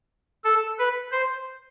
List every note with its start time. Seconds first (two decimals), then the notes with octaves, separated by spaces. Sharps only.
0.44 A4
0.79 B4
1.12 C5